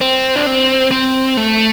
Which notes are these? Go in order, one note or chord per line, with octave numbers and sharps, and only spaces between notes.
C4
D4
C4
C4
A3